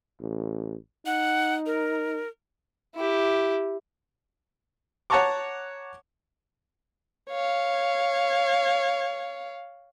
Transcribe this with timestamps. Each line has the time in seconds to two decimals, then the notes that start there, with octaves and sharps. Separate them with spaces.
0.21 A1
1.06 D#4 F#5
1.66 A#4
2.96 E4 G4
5.10 C#5 F#5 A5 A#5 C#6 D6
7.30 C#5 F5